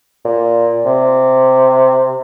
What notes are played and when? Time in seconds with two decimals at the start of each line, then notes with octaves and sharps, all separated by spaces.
0.25 A#2
0.86 C3